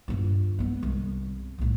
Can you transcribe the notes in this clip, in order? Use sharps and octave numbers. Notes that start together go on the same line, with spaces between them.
G2 F4
G#3 B3
C2
C2 A2